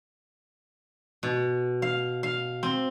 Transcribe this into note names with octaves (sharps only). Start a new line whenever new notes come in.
B2
F5
F5
C4